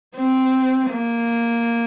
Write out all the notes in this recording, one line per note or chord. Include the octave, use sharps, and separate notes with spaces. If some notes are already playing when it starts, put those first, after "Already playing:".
C4
A#3